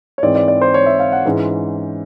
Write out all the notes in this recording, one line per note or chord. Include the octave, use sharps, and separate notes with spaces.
C#5
G#2 E3 G#3 C4 D5
D5
D5
C5
C#5
E5
F5
F#5
G#2 E3 G#3 C#4